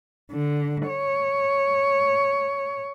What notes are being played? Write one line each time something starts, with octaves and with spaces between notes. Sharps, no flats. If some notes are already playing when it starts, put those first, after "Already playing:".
D3
C#5